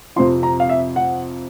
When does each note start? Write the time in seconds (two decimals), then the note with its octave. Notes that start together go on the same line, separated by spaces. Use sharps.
0.16 F2 C3 F3 C6
0.43 A#5
0.60 F5
0.69 E5
0.96 F#5